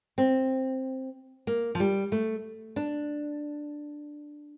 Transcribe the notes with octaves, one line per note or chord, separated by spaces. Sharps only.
C4
A#3
F3
G3
A3
D4